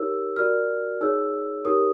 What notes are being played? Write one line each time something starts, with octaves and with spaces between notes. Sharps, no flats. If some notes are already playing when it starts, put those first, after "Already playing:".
Already playing: D#4 G4 A#4 C#5 E6
F#4 A#4 D5 F6
D#4 G#4 C#5 E6
D#4 G4 A#4 C#5 D#6